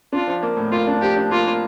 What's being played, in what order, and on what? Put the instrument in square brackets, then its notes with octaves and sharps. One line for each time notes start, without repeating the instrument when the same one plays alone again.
[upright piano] D4 [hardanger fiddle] F4
[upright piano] F3
A#3
A2
[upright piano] A#3 [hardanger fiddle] F4
[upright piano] D4
[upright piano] F3 [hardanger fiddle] G4
[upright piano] D4
[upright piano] A#3 [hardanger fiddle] F4
[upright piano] A#3